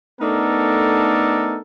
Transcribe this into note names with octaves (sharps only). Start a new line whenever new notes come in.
A3 B3 D4 D#4 A4 A#4